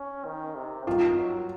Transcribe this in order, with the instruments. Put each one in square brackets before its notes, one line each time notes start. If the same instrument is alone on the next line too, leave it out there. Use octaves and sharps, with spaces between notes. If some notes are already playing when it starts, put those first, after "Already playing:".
Already playing: [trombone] C#4
D#3
C3
[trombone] D#3 [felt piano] F4
[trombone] F#3